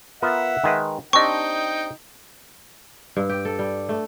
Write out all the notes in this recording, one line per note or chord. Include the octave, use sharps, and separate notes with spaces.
B3 F4 A#4 E5 F#5
D#3 G#3 B4
C4 D4 D#4 G4 D#5 G5 C#6
G2
G4
A4
G3
A3